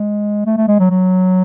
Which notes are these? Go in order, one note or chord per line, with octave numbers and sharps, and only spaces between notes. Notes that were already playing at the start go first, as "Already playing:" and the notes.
Already playing: G#3
A3
A3
G#3
F#3
F#3